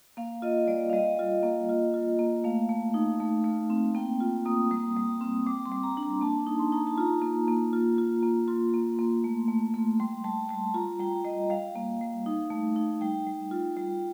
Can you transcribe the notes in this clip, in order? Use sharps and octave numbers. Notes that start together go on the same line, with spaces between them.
A#3 F5
F4 D#5
G3 D5
F5
G3 D#5
F4
A#3
F4
F4
A#3
A3 F5
A3
D#4
A3
A3
C4
A#3 G5
F4
A#3 D#6
G3
G3
C4
G3 D6
C6
G3
A#5
D4
A#5
A#3 A5
D#4
C6
D#4 A#5
A5
F4 A#5
A#3
A#3
F4
F4
A#3
F4 C6
A#3
A#3
A3
A3
A3
G3 C6
G3 A5
G3 A5
F4 A#5
G3 G5
G3 D#5
G3 F5
A#3
G3
D#4
A3
D#4
G3 G5
G3
F4
G3